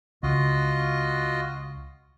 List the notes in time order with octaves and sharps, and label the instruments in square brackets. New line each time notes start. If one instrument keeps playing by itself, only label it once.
[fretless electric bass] C#2 [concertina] F4 F#4 D#5